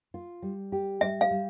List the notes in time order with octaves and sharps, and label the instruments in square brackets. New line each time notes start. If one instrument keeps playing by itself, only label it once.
[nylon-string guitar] F4
G3
G4
[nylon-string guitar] G3 [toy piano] E5
[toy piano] F5
[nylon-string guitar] G3